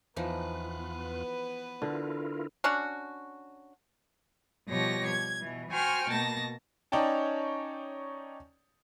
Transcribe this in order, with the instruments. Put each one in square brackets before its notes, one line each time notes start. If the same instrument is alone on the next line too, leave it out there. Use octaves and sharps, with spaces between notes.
[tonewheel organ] E2 F4 F#6 [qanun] E3 F3 D#4 [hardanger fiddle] B3 B4
[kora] D3 [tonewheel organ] E4 F4 A#4
[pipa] C#4 D4 F#4
[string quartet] B2 F3 G3 G4 C#5 A#6
G#6
B2 E3
F#4 C5 G5 G#5 C#6 F6
B2 A#3 A5 A#6
[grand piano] C#4 D#4 C#5 D5 G5 A5